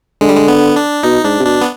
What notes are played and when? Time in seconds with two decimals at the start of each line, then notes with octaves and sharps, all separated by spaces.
0.21 D3 G#3
0.29 G3
0.37 G#3
0.48 B3
0.76 D4
1.03 B2 D#4
1.24 G#2 D4
1.40 C3
1.45 B2 D4
1.61 B3